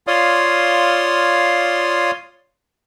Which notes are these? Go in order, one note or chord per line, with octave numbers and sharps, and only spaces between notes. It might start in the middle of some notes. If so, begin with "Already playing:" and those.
F4 C#5 D5 F5 C6 D#6